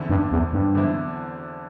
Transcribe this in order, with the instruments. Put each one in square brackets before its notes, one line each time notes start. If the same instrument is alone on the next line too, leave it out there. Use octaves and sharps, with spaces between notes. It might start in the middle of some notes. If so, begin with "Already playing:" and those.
Already playing: [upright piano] E2 D3 C4 E4
[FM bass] G2
E2
G2
[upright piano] E2 D3 C4 E4